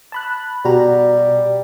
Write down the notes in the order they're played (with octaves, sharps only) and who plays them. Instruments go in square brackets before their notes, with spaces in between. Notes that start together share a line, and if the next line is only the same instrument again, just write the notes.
[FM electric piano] A5 B5 F#6
[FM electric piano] B2 F#4 A#5 [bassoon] G3